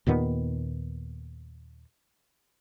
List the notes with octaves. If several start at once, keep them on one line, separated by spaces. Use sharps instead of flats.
D#2 A#2 D#3 B3